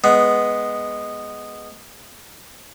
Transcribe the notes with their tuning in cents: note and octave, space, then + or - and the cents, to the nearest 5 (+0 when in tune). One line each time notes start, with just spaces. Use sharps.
G#3 +0 B3 +0